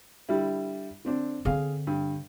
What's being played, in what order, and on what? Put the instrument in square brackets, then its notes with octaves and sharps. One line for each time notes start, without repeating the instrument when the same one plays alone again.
[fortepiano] D3 G3 E4
D3 C4 D4
[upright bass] D3 C4 [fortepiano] G#4 F5
[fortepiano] G2